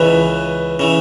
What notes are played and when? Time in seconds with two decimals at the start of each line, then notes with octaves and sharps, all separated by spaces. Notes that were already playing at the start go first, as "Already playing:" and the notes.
Already playing: C#2 C#3 E3 B4
0.79 C#3 E3